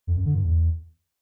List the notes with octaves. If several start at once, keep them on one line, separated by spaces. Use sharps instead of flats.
F2
F#2
D3
G2
E2